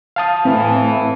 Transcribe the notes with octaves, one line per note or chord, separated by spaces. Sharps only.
F5 A5 D#6
A2 E3 C4